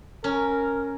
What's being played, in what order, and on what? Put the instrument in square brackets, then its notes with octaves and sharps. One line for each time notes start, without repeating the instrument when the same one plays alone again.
[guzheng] C#4 [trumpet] A#4